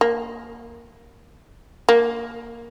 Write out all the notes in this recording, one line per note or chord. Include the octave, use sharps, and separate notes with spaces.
A#3
A#3